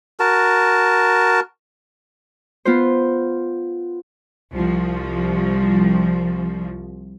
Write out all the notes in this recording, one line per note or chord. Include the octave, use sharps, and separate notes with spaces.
F#4 A#4 A5
B3 F4 C5
C2 F3